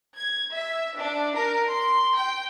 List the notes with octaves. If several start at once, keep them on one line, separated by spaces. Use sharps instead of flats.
G#6
E5
D4
A#4
C6
G5